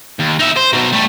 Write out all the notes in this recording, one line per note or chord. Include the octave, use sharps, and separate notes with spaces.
D#2
D#4 E5
C5
B2 F#3
G3 A3